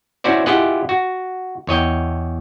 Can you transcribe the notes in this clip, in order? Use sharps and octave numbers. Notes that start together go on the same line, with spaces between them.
C#4 E4 F#4 C5 D5
E4 F4 G4 G#4 D#5 F#5
F#4
E2 C#5 D#5 G5